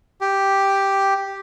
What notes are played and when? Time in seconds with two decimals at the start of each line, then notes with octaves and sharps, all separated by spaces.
0.21 G4